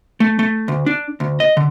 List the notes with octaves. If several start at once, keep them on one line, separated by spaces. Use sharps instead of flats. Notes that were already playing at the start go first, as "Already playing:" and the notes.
A3
A3
D2
D4
D2
D#5
D3